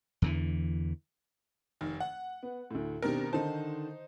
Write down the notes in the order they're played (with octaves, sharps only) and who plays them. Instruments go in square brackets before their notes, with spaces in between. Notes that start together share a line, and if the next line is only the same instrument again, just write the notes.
[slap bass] E2 D3 E3
[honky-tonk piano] F1 D#3
F#5
[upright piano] B3
D2 A2
[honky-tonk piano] B2 D#3 A#4 [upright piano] C4 D4 G4
[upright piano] D3 D#3 A5 [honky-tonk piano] D#4 C5